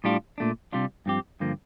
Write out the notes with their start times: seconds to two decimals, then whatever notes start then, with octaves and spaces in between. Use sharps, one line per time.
0.04 A2 G3 D4 F4
0.38 A#2 A3 D4
0.72 C3 G3 D4 F4
1.06 G2 F3 C4 G4
1.40 G2 D3 F3 A#3